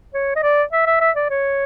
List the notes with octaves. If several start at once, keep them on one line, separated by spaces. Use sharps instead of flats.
C#5
D#5
D5
E5
E5
E5
D5
C#5